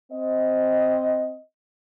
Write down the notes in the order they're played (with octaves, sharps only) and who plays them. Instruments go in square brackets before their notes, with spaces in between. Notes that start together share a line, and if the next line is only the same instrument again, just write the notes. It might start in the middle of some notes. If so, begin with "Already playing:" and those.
[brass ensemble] C4 D#5